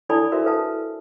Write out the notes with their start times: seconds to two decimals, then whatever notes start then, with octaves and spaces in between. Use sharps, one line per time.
0.09 D4 E4 A4 D5 G#5 B5
0.32 F#4 A#4 C5 E5 F5
0.45 A4 B4 F5 A5